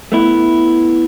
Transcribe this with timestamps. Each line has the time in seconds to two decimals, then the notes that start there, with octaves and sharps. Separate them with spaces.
0.12 A3 B3 E4